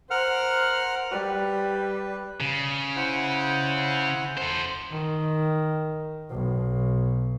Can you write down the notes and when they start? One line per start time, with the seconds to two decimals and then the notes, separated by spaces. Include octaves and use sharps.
0.10 A#4 C5 F#5 F6
1.12 G3 B4
2.41 C#3
2.96 E4 C5 F#5
4.37 A4 C5
4.91 D#3
6.30 B1